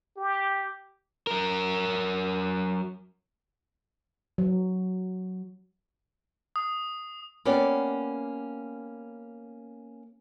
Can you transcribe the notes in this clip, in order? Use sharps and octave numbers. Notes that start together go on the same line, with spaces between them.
G4
F#3 A#4
F#3
D#6
A#3 B3 C#4 G4 D5